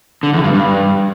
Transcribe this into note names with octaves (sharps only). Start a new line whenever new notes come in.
D3
E2
G2
G2